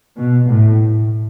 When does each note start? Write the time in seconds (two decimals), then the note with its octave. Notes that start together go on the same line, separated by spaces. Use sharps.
0.16 B2
0.48 A2